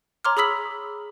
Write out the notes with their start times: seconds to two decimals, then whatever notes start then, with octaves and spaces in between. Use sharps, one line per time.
0.25 C#5 A#5 C6 D6 F6
0.37 G#4 B5 D#6 E6 B6 F#7